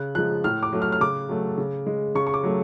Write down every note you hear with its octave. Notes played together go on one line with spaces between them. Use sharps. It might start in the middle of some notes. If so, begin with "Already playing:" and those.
Already playing: C#3 F#6
F3 G#3 F#6
A2 F6
D6
F#3 A3
F6
F6
C#3 D6
F#3 A3
C#3
G#3
C#3 C#6
C#6
D6
F#3 A3